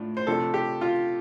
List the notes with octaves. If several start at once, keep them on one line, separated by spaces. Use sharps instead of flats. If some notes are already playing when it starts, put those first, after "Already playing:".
Already playing: A2 D4 F4
C5
C3 F3 A3 D4 A4
G4
F4